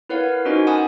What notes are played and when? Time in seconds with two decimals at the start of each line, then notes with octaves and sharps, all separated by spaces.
0.09 E4 A#4 B4 C#5 F5 F#5
0.45 C#4 D#4 F#4 A#4 C5 D#5
0.67 F#5 G#5 A5 B5 D#6